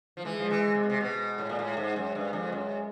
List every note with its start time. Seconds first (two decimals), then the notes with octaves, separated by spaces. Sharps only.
0.17 F3
0.25 E3 G#3
0.39 F3
0.50 E3
0.75 C3
0.83 B2
0.90 C3
1.00 B2 G#3
1.38 A2
1.49 A#2
1.59 A2
1.77 G#2
1.96 F#2
2.15 G2
2.33 F2
2.52 F#2